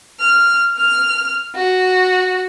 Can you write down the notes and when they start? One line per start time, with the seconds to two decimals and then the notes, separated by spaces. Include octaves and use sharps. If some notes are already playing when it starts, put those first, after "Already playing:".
0.20 F6
0.77 F6
1.56 F#4